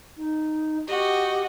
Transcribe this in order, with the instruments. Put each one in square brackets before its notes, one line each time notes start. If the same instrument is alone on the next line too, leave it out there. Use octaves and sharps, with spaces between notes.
[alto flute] D#4
[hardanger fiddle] F#4 D#5 [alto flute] G4